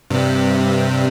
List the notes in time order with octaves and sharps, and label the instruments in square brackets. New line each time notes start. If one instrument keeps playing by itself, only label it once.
[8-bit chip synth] G2 C3